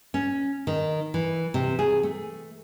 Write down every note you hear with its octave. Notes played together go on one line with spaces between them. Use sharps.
C#4
D#3
E3
C3
G#4
A3